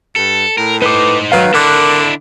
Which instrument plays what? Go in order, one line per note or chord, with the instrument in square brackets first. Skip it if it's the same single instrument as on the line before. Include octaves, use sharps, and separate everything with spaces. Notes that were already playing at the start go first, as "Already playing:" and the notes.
[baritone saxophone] G2 [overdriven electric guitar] A4
[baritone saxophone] A2 [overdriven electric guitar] A#4
[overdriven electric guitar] D#4 C5 [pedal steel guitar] B4 D6
[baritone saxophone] D#3 [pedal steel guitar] F#3 B4 F5
[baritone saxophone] D3 [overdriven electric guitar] D4 E4 [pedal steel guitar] A#4 D6 F#6